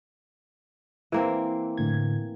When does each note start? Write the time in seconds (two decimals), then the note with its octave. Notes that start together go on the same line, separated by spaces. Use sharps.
1.12 E3 A#3 C4
1.78 A2 D3 G#6